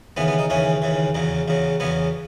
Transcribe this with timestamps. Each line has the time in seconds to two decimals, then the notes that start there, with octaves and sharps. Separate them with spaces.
0.17 D#2 C#3 E3 B3
0.28 B3
0.39 D#4
0.50 D#2 C#3 E3 C#4
0.82 D#2 C#3 E3
1.15 E2 C#3 F#3
1.48 E2 C#3 F#3
1.80 E2 C#3 F#3 B3